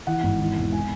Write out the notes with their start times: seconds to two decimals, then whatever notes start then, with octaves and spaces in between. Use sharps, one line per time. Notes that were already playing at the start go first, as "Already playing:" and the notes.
0.07 E3 F#5
0.23 G#1
0.40 E3
0.56 E1
0.72 G#5